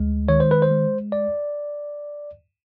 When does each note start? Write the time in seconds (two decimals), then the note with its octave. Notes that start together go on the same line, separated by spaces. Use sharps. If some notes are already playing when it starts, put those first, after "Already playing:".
Already playing: D2 G#3
0.29 D#3 C#5
0.40 C5
0.51 B4
0.62 C5
0.71 G#3
1.12 D5